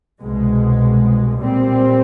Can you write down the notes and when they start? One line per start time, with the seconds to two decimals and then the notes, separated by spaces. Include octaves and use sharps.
0.20 C2 B2 G#3
1.38 A#2 G3 C4